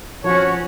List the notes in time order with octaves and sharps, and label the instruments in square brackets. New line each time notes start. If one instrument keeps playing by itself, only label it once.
[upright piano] F3 [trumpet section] C#4 F#4 C#5